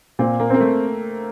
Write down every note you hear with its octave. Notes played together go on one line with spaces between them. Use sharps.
A#2 C4
A#3
A#3 C4
A3